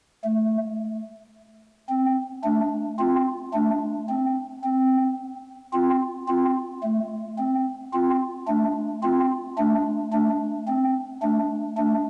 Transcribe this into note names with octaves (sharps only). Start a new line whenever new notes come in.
A3
C4
A3 D4
C4 F4
A3 D4
C4
C4
C4 F4
C4 F4
A3
C4
C4 F4
A3 D4
C4 F4
A3 D4
A3 D4
C4
A3 D4
A3 D4